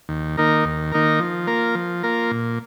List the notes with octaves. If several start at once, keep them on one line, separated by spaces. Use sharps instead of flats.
D#2
D#3 A#3 D#4 A#4
D#2
D#3 A#3 D#4 A#4
F3
A#3 F4 A#4
F3
A#3 F4 A#4
A#2